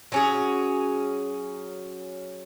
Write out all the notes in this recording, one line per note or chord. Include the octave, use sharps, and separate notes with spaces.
F#3 C#4 G#4